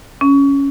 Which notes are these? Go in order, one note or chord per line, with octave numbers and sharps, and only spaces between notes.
C#4